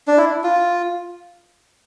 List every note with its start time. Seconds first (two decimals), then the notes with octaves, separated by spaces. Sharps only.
0.08 D4
0.17 E4
0.44 F4